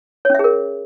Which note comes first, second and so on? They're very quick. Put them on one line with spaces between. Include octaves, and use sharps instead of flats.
C#5 C#4 E5 G#4 A#4